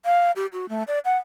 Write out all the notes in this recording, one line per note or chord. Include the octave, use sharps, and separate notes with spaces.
F5
G4
F#4
A3
D5
F#5